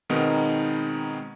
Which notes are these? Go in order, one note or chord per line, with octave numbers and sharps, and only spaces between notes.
B2 D#3 G#3 B3 C4 D#4